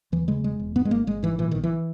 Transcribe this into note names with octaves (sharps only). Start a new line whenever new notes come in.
D#2 E3
C#3 G#3
E1 G#3
E1
G#2 B3
G#3
G#1 A#3
G#1 G#3
G#2 E3
A#2 E3
B1 D#3
E3